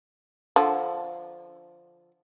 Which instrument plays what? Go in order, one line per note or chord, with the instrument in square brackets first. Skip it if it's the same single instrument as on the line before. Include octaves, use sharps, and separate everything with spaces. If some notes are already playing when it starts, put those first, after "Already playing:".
[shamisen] D3 F3